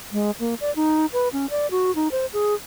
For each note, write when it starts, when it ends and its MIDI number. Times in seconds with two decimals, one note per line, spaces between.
0.13 0.31 56
0.40 0.55 58
0.61 0.74 74
0.76 1.06 63
1.13 1.28 71
1.33 1.50 61
1.50 1.70 74
1.71 1.94 66
1.95 2.11 63
2.12 2.26 72
2.33 2.55 68